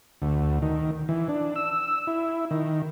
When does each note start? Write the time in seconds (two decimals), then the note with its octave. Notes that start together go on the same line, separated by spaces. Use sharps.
0.22 D2
0.62 D#3
1.09 E3
1.29 D4
1.56 E6
2.07 E4
2.51 D#3